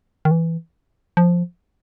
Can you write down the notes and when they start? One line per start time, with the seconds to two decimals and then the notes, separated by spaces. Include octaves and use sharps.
0.25 D#3
0.31 E3
1.17 F3